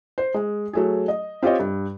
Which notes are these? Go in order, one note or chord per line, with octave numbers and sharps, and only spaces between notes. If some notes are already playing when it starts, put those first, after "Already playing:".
C5
G#3
F#3 A3 G#4
D#5
C4 F4 G4 C#5 D#5
G2